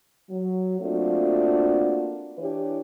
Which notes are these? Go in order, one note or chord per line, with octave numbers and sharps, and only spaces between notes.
F#3
A3 A#3 C4 D4 F4 F#4
E3 D4 E4 G4 B4 C#5